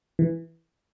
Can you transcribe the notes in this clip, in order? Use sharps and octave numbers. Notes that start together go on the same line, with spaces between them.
E3